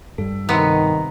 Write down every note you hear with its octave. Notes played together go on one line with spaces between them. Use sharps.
G2 G3 A4
C3 D#3 B3 A#5